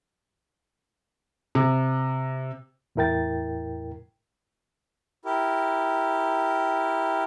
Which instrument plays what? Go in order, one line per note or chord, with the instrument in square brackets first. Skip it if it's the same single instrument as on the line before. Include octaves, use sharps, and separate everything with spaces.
[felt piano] C3
[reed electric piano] E2 A2 E4 A#4 G5 A6
[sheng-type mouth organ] E4 G4 A#4